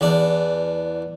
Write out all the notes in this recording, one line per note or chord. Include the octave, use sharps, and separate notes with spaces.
E2 D4